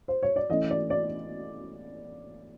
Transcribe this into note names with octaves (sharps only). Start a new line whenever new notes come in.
C5
C#5
D5
E3 A3 C#4 D#5
D5
D5